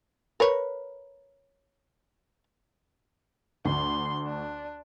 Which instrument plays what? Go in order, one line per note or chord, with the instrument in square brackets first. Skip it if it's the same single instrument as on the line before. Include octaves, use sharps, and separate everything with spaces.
[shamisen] A#4 B4 C#5
[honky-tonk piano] D2 [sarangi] C6
[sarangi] D4